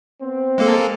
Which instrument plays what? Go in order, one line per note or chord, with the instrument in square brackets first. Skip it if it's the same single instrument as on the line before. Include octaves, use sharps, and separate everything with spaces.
[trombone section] B3 C4
[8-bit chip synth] G#3 A#3 A4